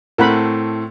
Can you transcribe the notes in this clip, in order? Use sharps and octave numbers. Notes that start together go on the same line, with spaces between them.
A2 A3 C4 A#4 F#5 B5